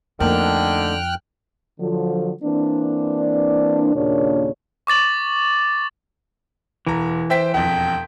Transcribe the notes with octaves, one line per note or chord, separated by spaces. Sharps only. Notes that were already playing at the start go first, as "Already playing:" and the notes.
F2 D3 A3 A#3 D#4 G5 F6 F#6
D3 F3 F#3
E3 A#3 C4 D4
D#2 A#2 C#3 D4 C#5
C#6 D6 A6 F#7
E1 E3 A#5
C5 E5 G5 B6
E1 F2 G5